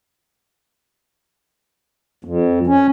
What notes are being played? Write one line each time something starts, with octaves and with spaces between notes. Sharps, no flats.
F2
C#4